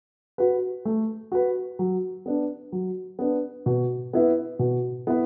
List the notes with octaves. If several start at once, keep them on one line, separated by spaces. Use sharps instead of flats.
F#4 B4
A3
F#4 B4
F#3
B3 D4
F#3
B3 D4
B2
B3 E4 B4
B2
B3 E4 B4